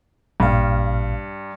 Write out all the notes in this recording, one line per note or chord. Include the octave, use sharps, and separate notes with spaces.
A1 G2 A#2 F5